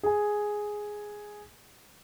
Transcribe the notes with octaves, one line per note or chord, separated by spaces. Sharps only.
G#4 G#5